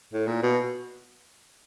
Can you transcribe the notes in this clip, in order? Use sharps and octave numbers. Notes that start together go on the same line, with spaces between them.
A2
A#2
B2